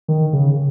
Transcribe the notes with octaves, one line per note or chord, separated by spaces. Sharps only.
D#3
C#3